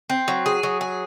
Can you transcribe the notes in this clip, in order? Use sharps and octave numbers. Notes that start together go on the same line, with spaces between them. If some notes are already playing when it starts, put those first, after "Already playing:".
C4
F#3
G#4
F#3
G#4